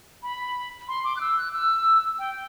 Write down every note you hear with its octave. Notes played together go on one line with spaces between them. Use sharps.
B5
C6
D6
F#6
E6
F#6
E6
G5